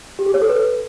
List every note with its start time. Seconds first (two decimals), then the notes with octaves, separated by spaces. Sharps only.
0.19 G4
0.26 G#4
0.34 C#5
0.42 A4
0.49 B4